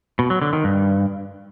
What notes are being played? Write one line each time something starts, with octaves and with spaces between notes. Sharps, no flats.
B2
F#3
D3
D#3
G2